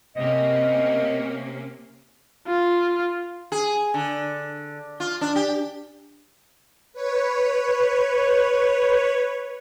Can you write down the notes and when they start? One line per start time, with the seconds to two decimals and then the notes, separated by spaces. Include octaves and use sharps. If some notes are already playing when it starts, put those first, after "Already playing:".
0.16 C3 A#3 C#4 D#5
2.47 F4
3.52 G#4
3.94 D3
5.00 F4
5.21 D4
5.36 G4
6.93 B4 C#5